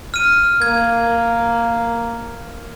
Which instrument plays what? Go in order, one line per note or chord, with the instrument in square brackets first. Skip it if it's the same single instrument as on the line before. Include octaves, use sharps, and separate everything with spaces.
[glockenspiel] F6 D#7
[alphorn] A#3 [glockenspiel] G#6